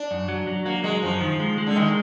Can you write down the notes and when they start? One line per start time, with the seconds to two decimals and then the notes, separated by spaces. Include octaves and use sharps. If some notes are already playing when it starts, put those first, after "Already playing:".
Already playing: D4
0.11 F#2
0.28 F#3
0.47 F#3
0.65 F#3 A#3
0.84 F#3 G#3
1.03 F#2 F3
1.21 D#3
1.40 G#3
1.58 G#3
1.66 D3
1.76 D#3 G#3